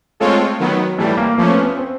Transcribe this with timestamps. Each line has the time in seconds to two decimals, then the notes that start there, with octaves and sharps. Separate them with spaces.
0.20 G#3 A3 C4 F4 A4 C#5
0.59 D#3 F#3 B3
0.98 A2 E3 G3 A3
1.17 A#3
1.38 F3 A3 A#3 C#4
1.51 B3
1.63 B3
1.77 C4